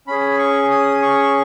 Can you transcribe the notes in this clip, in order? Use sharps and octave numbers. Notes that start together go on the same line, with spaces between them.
C#4 G#4 B5
C#6
D#6
C#6